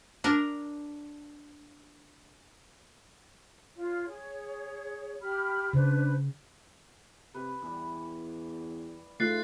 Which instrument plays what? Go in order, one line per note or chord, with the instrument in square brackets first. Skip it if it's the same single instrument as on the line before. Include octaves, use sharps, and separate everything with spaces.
[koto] D4 A#4
[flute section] F4 C#5
G#4 C#5
G4 B5 F6
[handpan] C#3 [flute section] D4 B4 C5
[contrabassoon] C3 [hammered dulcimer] B4
[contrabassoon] E2 [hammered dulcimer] E3 G3
[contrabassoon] G#2 [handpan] A3 F4 [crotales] F#6 A6 C7